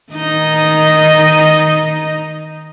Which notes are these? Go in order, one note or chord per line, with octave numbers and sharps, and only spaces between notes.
D#3 D#4 D#5